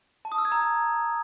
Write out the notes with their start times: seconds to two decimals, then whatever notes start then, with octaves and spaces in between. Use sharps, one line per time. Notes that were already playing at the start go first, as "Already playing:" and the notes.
0.25 A5
0.32 D#6
0.38 E6
0.45 G#6
0.52 A#5